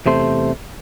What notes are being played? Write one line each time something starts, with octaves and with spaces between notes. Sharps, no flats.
E2 C3 A3 C5